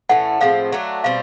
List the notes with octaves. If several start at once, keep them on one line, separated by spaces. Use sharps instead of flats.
A2 E3 A3 C#4 F#5
A2 F3 G#3 C4 F5
F#3 A3 D4
B2 G3 C4 F5